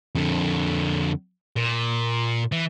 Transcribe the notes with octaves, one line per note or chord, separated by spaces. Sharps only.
F2 D3
A#2
E3